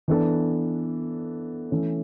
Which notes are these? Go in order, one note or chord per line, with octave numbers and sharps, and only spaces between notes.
E3 B3 D4 A4
E3 A3 C#4